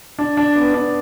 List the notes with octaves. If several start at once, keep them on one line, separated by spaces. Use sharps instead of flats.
D4
D4
B3
D4